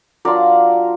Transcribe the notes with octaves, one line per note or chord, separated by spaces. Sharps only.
F#3 D4 F4 A#4 D5